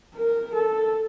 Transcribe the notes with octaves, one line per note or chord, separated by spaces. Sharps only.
A#4
A4